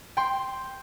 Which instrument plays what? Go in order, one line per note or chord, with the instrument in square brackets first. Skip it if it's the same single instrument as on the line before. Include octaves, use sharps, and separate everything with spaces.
[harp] G5 C6